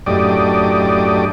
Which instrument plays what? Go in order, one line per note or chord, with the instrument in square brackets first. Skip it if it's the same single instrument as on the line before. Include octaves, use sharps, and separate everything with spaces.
[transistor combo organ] F#2 A2 D4 G4 D5 D#5